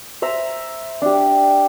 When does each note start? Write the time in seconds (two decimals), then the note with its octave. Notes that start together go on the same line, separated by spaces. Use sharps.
0.22 C5 E5 A#5
1.02 D4 G4